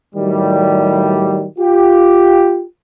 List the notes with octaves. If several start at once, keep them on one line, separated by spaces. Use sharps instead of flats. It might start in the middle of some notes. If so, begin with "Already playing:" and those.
A2 D#3 F#3 G3
F4 G4